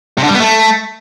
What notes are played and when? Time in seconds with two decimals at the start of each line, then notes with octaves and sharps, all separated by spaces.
0.18 C3
0.23 D3
0.29 G3
0.35 B3
0.40 A3